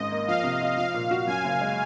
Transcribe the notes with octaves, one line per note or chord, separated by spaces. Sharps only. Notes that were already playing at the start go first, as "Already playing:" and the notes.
Already playing: G#1 G#2 C#4 D#5
A#3
F3 F5
C3
F4
F3 F5
A#2
F#4
F#2 G#5
F#1
G#3